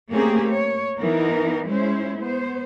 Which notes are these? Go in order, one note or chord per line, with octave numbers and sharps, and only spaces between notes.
A3 A#3 C4 C#4 G4 G#4
C#5
E3 B3 D#4 A#4
G#3 C#4 E4 C5
B3 C5